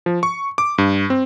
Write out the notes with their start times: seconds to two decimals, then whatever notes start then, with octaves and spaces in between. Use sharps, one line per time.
0.06 F3
0.23 C#6
0.58 D6
0.78 G2
1.10 C4